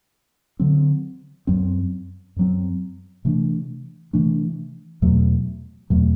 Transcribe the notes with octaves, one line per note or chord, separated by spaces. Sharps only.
D3 F#3 C4
F#2 F#3 C4
F#2 F#3 C4
C3 E3 A3 D4
C3 E3 A3 D4
E2 B2 F#3 A3
E2 B2 F#3 A3